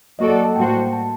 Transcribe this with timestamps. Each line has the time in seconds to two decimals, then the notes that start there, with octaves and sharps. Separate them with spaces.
0.19 F#3 A#3 F#4 A4 D5 D#5
0.31 F#5
0.44 A5
0.56 A2 G3 A#3 F#4 C5 G5
0.93 A5